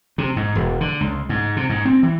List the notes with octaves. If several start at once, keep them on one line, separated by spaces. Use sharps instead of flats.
C3
G#2
E1
D3
C#2
G#2
C3
G#2
C4
E3